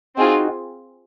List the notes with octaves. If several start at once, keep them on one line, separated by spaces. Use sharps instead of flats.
C4 D#4 F4 F#4 G#4